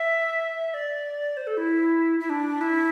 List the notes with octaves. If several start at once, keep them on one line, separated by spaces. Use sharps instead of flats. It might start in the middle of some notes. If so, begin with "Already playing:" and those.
Already playing: E5
D5
C5
A4
E4
E4
D4
E4